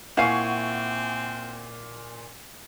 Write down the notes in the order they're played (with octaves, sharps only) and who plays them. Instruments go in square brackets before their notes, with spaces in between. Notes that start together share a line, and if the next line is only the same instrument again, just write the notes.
[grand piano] A#2 G#5 E7 [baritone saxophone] C4 [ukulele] E4 F5 [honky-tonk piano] F#5 C#6